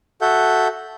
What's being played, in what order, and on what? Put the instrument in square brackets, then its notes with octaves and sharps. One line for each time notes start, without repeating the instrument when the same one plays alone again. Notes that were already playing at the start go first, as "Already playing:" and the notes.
[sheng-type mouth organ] F#4 A4 E5 F#5 G6